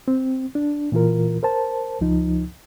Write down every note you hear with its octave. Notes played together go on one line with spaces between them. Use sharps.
C4
D4
A#2 E3 F4 A#4
A#4 C5 A5
C#2 F3 D#4